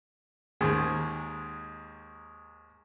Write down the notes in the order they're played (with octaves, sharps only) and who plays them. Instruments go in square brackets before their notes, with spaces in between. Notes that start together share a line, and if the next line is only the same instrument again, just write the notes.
[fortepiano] D#2 G#2 D#3 G#3